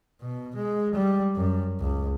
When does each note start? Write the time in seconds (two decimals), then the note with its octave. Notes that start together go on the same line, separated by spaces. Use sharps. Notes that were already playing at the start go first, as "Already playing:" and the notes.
0.21 B2
0.56 G#3
0.94 G3
1.36 F#2
1.80 C#2